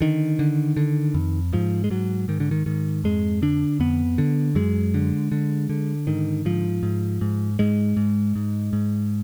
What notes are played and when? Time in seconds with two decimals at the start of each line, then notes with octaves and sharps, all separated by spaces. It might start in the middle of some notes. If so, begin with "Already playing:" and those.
0.01 D3 D#3
0.39 D3
0.77 D3
1.14 F2
1.53 G#2 F3
1.84 G#3
1.90 G#2 F#3
2.28 G#2 D#3
2.40 D3
2.51 D#3
2.66 G#2 D#3
3.04 F2 G#3
3.42 D3 D4
3.80 F2 B3
4.18 D3
4.55 F#2 G#3
4.94 D3
5.32 D3
5.69 D3
6.07 G#2 D#3
6.45 G#2 F3
6.83 G#2
7.21 G#2
7.59 G#2 G#3
7.97 G#2
8.35 G#2
8.73 G#2